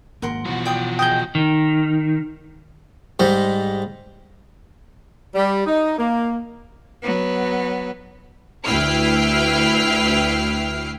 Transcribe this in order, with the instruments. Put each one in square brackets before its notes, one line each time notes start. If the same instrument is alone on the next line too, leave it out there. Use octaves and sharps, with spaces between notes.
[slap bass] G#1 A#3 [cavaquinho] A#4 F#5 C6
[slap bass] B2 E3 [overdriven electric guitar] F3 F#4
[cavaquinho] D5 G5 D#6
[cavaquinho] G#4 D#5 D#6 [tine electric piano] G5 G6
[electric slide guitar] D#3
[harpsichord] G#2 G3
[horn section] G3
D#4
A#3
[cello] F#3 B3
[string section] D2 E4 B4 G5 F6 C7